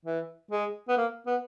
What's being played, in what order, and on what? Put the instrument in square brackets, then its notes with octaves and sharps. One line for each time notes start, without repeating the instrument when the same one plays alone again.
[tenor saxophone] E3
G#3
B3
A#3
B3